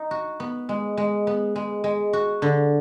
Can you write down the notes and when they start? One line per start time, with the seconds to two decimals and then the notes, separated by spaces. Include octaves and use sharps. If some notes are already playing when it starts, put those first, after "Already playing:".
Already playing: D#4
0.11 F#4
0.40 B3
0.69 G#3
0.97 G#3
1.27 B3
1.56 G#3
1.84 G#3
2.13 F#4
2.42 D3